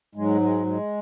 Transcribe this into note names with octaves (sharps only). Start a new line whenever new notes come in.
G#2 F#3 G#3
G#3
G#3